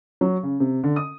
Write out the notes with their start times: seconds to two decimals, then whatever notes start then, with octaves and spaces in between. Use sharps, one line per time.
0.21 F#3
0.43 C#3
0.60 C3
0.84 D3
0.96 D#6